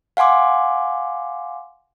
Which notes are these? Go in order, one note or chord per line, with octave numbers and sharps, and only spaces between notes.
F5 F#5 G#5 C6 D6